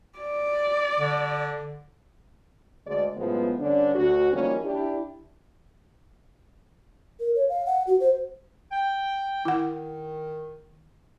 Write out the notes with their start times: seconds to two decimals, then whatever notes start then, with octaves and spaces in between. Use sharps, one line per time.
0.18 D5
0.99 D3
2.86 D2 G#3 D5
3.17 F#2 A2 F3 G#3 B3
3.59 G2 D3 C#4 D4
3.95 D2 F#4
4.33 D#3 F3 G3 A#3 C#4
4.63 D4 E4 G4
7.20 A#4
7.35 C#5
7.49 F5
7.66 F#5
7.87 F#4
8.00 C5
8.71 G5
9.45 D#3 E4 F#5